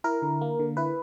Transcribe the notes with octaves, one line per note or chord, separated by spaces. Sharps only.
E4 A#4
D3
A#3
D3
E4 B4